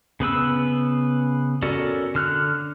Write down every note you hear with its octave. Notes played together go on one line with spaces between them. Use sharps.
C#3 B3 B4 E6
C#4 F#4 A4 A#4 D5
D3 F6 F#6